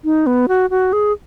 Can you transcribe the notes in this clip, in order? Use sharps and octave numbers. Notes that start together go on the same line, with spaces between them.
D#4
B3
F#4
F#4
G#4